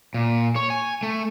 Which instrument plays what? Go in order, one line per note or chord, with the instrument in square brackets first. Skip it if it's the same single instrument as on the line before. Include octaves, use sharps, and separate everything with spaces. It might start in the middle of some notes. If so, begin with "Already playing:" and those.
[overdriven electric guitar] A#2
C#5
G#5
A3